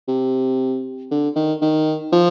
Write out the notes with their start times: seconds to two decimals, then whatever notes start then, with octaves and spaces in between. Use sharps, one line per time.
0.08 C3
1.11 D3
1.35 D#3
1.61 D#3
2.13 F3